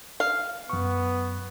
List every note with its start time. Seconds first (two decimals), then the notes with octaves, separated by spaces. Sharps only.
0.20 F5
0.70 F#2 B3 C#6